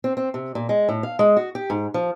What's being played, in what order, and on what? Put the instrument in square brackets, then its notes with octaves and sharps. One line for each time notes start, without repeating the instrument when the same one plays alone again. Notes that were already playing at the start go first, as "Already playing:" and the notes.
[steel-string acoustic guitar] C4
C4
C3
A#2
G#3
A2
F5
G#3
F#4
G4
G#2
F3